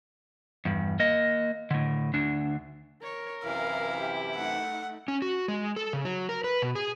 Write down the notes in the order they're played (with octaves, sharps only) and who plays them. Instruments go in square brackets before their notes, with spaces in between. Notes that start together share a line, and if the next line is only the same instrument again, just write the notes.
[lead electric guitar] E2 G2
A#3 D#5
A2 D3
D2 D4
[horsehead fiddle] A#4 [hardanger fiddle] C#5
[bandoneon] F#2 C3 E3 [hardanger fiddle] E4 [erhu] F5
[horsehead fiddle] G4
[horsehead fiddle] A3 D#4 [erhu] F#5
[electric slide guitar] C#4
F#4
G#3
A4
C#3
F#3
A#4
B4
B2
G#4